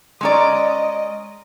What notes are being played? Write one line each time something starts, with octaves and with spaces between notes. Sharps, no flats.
G#3 C#4 D5 D#5 A#5 C6